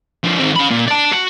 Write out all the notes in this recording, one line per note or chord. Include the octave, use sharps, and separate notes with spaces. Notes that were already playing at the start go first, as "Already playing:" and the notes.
D3 F3
D#3 C4
C#3 B5
A#2
D5 A5
F#4